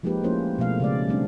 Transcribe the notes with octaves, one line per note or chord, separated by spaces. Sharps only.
F3 G#3 A#3 D#4 G4 B4
F3 A3 A#3 C#4 E4 C5
B2 F3 A3 F5
C#3 G#3 D5
G3 A3 C4 D4